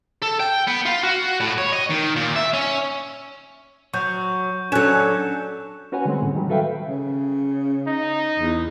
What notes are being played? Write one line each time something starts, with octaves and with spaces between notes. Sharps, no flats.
A4
G5
B3
F4
F#4
A2
C#5
D#5
D#3
A#2
E5
C#4
F#3 C#6 G6
F#3 C#4 D4 A4 F#6 E7
C#4 F#4 B4 C#5 F#5 G#5
D3 G3 G#3 C4
A2
D#3 F#3 G3
F#4 A4 B4 E5 F5 G5
C#3
D#4
E2